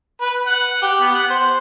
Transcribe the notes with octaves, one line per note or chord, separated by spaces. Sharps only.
B4
F#5
G4
B3
F#5
C5